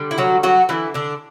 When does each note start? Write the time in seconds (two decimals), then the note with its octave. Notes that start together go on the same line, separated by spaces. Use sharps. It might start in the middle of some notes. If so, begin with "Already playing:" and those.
Already playing: D3 G3
0.11 E4
0.18 F#3 F#4
0.43 F#3 F#4
0.69 D3 E3 G3 E4
0.94 D3 D4